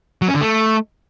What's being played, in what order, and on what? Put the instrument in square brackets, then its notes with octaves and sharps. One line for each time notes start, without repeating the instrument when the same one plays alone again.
[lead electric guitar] F#3
C#4
D3
A3